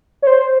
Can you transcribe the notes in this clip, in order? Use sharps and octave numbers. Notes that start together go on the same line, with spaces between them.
C#5
C5